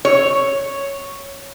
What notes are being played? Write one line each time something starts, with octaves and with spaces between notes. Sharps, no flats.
C#5